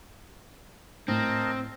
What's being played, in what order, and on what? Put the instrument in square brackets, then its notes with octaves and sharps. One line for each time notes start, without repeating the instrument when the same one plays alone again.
[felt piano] A2 [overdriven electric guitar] C4 [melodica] A#4 D#5 A5